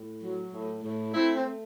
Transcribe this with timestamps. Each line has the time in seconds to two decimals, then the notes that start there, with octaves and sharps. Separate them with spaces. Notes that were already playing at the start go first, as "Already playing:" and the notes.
Already playing: A2
0.21 F#3
0.52 A2
0.83 A2
1.14 A3 C4 E4
1.35 C4
1.45 A3